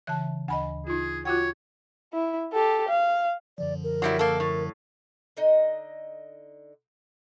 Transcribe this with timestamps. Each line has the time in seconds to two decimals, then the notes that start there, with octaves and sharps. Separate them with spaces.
0.07 C#3 E3 E5 A5 F#6
0.48 D2 D#5 G#5 B5
0.87 D#4 F4 G#4
1.25 F4 F#4 C#5 F#5 G5 D6 F#6
2.13 E4
2.53 G4 A4
2.89 F5
3.58 F#2 D3 F3 D5
3.83 A#4
4.02 F#3 G3 E4
4.19 A#3 A4
4.40 A2
5.37 D3 D#4 D#5